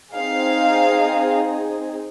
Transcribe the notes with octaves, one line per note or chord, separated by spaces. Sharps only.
C4 D#4 G#4 F5